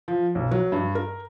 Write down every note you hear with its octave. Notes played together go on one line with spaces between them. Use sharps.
F3
B1
F#3
G2
A#4